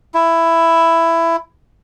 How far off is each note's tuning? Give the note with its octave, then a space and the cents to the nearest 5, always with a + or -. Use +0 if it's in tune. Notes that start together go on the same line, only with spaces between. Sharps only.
E4 +10